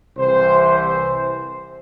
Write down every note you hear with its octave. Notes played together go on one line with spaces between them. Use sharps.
C2 C3 E3 C5
C5